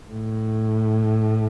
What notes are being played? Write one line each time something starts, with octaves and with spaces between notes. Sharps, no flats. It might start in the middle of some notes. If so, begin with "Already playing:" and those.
A2